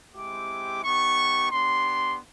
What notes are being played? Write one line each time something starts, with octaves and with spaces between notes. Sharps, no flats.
G#3 C4 E4 G4 D6
B3 D#4 G4 C#6
B3 D4 G4 C6